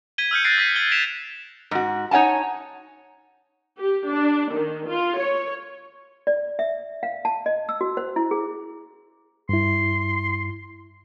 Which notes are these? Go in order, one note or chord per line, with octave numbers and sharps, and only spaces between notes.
G#6 B6 D#7 G7
E6 F6 G6 C#7
F#6 A6 A#6 C7 D7
E6 B6 C7 D#7
G#6 G7
A6 B6 D7 E7 F7
G#2 F#4
D#4 C#5 F#5 G#5 A5
G4
D4
D#3
F4
C#5
D5
E5
F5
A5
D#5
E6
F#4
C5
E4
G#4
G2 E4 C6